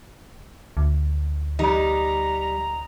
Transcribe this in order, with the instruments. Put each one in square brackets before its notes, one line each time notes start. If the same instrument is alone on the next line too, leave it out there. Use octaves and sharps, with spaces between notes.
[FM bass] D2
[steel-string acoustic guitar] G3 [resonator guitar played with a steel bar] D#4 [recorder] A#5